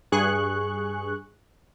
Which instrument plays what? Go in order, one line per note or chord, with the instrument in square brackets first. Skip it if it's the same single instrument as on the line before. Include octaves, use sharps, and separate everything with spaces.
[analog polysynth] G2 G#4 C#6 F#6